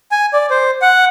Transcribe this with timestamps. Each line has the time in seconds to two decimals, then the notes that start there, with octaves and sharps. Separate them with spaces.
0.11 G#5
0.33 D5
0.50 C5
0.82 F#5